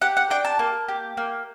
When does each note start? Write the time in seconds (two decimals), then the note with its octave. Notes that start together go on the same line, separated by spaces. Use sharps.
0.02 G4 F#5
0.17 F#5
0.30 D4 G5
0.45 A5
0.59 A#3
0.88 G4
1.17 A#3